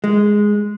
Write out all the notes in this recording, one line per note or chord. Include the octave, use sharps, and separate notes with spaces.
G#3